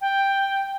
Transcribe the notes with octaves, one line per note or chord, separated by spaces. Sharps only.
G5